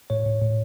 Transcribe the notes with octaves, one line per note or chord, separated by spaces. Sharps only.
A2 C#5
A2
A2